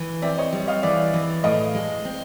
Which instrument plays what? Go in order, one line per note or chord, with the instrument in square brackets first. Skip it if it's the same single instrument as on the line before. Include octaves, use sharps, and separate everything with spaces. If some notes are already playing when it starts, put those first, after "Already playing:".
Already playing: [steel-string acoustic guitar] E3
[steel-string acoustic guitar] C4 [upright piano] D5 E5
[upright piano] C#5 D#5
[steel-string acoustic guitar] G3
[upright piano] D#5 F5
[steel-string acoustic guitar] E3 [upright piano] D5 E5
[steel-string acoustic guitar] E3
[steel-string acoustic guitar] A2 [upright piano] D#5 F5
[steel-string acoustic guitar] G#3
C4